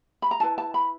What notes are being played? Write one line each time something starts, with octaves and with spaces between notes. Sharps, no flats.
B5
A#5
E4 G#4 B4 A5
A5
B5